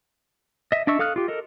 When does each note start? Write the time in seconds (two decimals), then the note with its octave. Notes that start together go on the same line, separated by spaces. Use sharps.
0.72 D#5 E5
0.87 D4 D#5 E5 C#6 E6
0.99 A4 F5 D#6 F6 F#6
1.16 F4 G4
1.28 A4 A#4 D#5